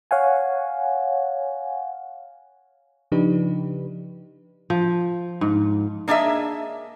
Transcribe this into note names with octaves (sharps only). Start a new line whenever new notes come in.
C#5 F5 F#5 G#5
C#3 F3 D4 D#4 G4 B4
F3
G#2
A#3 D4 G#4 D#5 E5